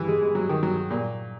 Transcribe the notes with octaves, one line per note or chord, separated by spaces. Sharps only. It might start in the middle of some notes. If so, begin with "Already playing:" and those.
Already playing: E3
G#3
G#3
F#3
D#3
F#3
A#2